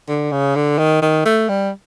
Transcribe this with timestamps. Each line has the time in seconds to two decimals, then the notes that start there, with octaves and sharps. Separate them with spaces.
0.08 D3
0.32 C#3
0.56 D3
0.79 D#3
1.02 D#3
1.26 A3
1.49 G3